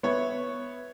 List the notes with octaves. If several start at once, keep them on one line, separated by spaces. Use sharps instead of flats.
B3 C#5 E5